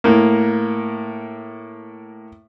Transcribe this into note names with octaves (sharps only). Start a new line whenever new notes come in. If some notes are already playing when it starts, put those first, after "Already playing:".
A2 A#3